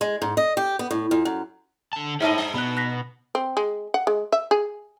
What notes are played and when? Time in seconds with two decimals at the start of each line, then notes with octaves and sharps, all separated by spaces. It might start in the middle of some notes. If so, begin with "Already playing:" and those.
0.01 G#3
0.22 G#2
0.37 D#5
0.57 G4
0.79 B3
0.91 A2
1.11 F2
1.25 F#2
1.93 D3 A5
2.20 A2 D#4 G#4 C5 D#5 E5 A5
2.38 D4
2.54 B2 B3 B5 F#6
2.77 F#6 A#6 B6
3.35 C4
3.57 G#3
3.94 F#5
4.07 G#3
4.32 E5
4.51 G#4